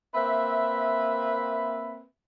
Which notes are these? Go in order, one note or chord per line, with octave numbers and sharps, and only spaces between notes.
A#3 C4 B4 E5